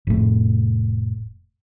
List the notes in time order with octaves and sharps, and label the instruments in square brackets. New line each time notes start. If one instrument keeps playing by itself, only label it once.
[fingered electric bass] F1 A2